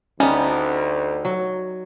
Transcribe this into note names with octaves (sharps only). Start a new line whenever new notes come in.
D2 G3 B3 C#4 D#4
F#3